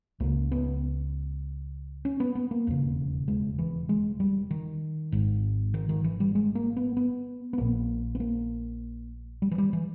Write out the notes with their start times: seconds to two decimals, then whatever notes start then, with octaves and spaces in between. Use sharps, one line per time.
0.20 C#2 C#3 A#3
0.52 B3
2.05 C#4
2.20 B3
2.35 B3
2.51 A#3
2.67 E1 D#2 C#3
3.28 G#3
3.59 E3
3.89 G#3
4.20 G3
4.51 D#3
5.12 G#1 G#2
5.74 D#3
5.89 D#3
6.04 E3
6.20 G3
6.35 G#3
6.55 A#3
6.77 B3
6.97 B3
7.53 B3
7.58 A#1 A#2 A#3
8.15 B3
8.20 A#3
9.42 G3
9.51 E3
9.58 G3
9.73 E3